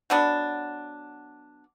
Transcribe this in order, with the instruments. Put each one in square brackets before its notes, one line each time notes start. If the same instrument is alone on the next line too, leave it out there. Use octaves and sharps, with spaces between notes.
[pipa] F#3 B3 D4